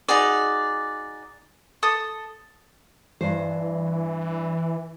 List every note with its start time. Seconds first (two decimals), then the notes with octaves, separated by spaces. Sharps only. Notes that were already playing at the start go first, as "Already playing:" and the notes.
0.08 D#4 F#4 G#4 D5
1.83 A4 D#6
3.21 G2 E3 C5